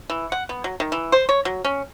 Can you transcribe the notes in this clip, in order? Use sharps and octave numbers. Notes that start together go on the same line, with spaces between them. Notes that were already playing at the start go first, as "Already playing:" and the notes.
E3
F#5
B3
F#3
D#3
E3
C5
C#5
F#3
C#4